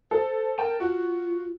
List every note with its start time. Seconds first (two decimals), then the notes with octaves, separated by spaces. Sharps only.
0.11 A4 C5
0.58 A#4 G5 A5 E7
0.80 F4 F#4